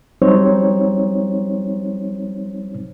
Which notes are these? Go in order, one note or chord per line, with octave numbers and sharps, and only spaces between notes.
F#3 G3 C4 D#4 C5 C#5